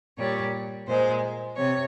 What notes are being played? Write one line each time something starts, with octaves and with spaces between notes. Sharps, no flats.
A#2 G3 C#5
A#2 G#3 C5
C3 C#5